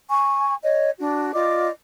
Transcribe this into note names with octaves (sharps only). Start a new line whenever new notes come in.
G#5 C#6
C#5 D#5
D4 F#4
F4 D5 D#5 D6